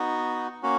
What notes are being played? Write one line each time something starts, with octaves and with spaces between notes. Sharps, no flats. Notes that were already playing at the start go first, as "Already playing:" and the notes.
Already playing: B3 D#4 F#4
A#3 C#4 F#4